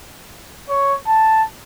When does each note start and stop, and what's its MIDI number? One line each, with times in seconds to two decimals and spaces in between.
0.69 0.94 73
1.07 1.42 81